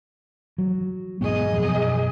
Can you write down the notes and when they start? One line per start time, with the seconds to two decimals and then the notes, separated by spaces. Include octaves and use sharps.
0.58 F#3
1.21 E1 G#2 B3 G#4 D#5
1.53 F#2 B2 F3